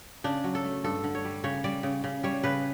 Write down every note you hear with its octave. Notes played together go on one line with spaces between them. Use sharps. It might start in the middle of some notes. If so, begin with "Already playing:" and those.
C#3 D4
F#3
A4
A3
G2 A4
D3
C#5
G3
C#3 C#5
G3 D5
C#3
C#3
G3 C#5
C#3 B4